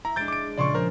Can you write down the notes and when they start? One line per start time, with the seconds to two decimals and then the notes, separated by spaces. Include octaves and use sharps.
0.05 E4 A#5
0.16 G#3 D4 G6 A6 D7
0.28 D6 D7
0.58 A#2 C#3 F3 D5 C6 C#6
0.75 A#4 C5